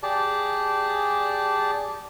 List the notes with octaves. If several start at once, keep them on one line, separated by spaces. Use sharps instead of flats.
G4 G#4 D5 A5